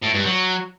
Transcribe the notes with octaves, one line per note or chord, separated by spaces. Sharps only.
A2
G2
F#3